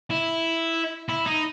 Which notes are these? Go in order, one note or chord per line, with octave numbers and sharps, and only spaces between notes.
E4
E4
D#4